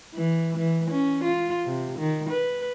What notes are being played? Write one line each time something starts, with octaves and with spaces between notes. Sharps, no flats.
E3
E3
C#4
F4
C3
D#3
B4